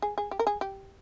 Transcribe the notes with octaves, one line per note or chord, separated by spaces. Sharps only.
G#4
G#4
G4
A#4
G#4
G4